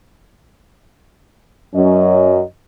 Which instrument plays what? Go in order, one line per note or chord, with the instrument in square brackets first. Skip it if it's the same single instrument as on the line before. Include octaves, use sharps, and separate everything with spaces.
[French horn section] F#2 F#3 C#4 D#5